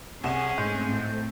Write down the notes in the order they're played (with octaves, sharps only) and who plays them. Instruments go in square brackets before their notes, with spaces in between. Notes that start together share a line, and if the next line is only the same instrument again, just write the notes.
[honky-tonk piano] C2 C3 E7 [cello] C#4 G#4 [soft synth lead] F#5
[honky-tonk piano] G#2 [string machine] A3 C4 [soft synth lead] G6
[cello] A2